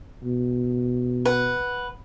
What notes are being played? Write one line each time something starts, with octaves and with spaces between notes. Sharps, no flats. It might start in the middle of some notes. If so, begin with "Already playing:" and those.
B2
B4 F#5